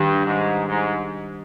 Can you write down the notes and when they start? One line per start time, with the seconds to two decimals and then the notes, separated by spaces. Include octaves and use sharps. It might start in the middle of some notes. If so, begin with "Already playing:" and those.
Already playing: G2 D#3 G3 D4 G4
0.25 G#2
0.68 G#2